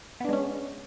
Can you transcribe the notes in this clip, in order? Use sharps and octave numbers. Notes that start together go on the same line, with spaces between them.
G#3 B3 C#4 D4